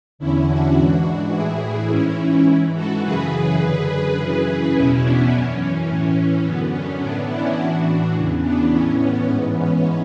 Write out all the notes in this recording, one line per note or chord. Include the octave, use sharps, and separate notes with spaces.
E2 D3 C#4 E4
D4 F#4
G#2 E3 D4 F#4
A2 E3 E4 G#4
G#2 E3 C#4 E4
G#2 E3
F#4 A4
F#2 C#3 E3 G#4 B4
F#2 D3
F#2 C#3 E3 G#4 B4
E2 B2 C#4 E4
B3 D4
F#2 E3 C#4
A2 E3
F#2 D3 B3
C#4
A2 E3 B3 D4
C#4 E4
A2 E3 D4 F#4
D4 F#4
E2 C#3 E3
B3 D4
A2 E3 C#4
B3
G#2 E3 B3
C#4